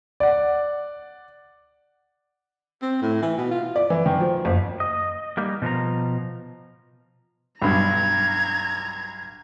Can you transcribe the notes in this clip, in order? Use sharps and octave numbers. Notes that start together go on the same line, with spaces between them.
D5 F#5
C4
A2
E3
B2
F4
D5
E3
D#3
F3
F#1
D#5
G3 A#3 D#4
B2 F3 A#4 A#5
B1 G2 A#5 G#6